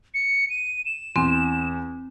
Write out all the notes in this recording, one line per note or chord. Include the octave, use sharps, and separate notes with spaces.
C#7
D#7
E7
E2 C4